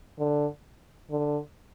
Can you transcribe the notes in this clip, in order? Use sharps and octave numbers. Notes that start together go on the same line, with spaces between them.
D3
D3